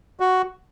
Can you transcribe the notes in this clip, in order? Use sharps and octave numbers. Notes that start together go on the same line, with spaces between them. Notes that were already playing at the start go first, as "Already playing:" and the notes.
F#4